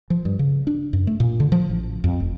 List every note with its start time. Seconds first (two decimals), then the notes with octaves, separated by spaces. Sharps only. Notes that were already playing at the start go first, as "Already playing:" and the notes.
0.10 F3
0.25 G2
0.39 C#3
0.67 D4
0.93 F#2
1.07 A3
1.20 A#2
1.40 D3
1.52 F3
1.70 A1
2.04 F2
2.20 F1